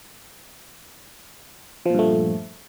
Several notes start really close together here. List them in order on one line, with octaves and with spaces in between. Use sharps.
F3 A#2 G2 A3